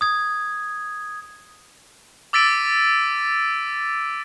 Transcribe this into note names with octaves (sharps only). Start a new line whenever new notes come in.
D#6 G#6
D6 E6 A6 B6 D7 D#7